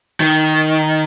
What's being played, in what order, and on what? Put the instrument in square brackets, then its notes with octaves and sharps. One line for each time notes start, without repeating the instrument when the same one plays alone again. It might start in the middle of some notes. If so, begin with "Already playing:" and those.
[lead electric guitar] D#3